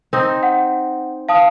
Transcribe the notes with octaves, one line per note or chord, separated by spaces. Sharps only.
C4 D#4
F#5
F5 A5 D#6